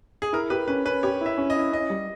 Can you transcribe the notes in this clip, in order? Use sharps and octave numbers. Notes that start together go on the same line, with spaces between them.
G#4
E4 A#4
G4 B4
C#4 B4
C#4 B4
G4 C#5
E4 E5
C#4
D#5
E4
C#4 D#5
G3